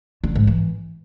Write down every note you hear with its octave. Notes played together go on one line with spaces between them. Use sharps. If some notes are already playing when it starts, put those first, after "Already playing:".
D3
G#2
E3